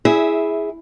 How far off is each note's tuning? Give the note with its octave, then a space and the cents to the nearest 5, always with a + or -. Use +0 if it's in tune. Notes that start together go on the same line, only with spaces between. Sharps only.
E4 +0 G#4 +0 E5 -20